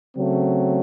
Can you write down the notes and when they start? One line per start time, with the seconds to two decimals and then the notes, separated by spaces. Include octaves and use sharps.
0.17 C#3 F#3 A3 C4